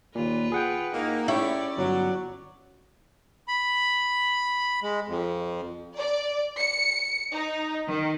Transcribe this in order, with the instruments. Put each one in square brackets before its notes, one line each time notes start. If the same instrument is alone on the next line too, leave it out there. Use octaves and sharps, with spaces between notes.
[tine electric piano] D#2 A#2 [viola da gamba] F4 B4
[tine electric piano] G#4 F#5 G5
[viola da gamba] G#2 D#4 E4 [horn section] A#3
[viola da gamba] C#4 D5 [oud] E4 [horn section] G4 A4 C#5
[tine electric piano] G1 [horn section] F#3
[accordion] B5
G#3
F2
[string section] D5
C#7
D#4
D#3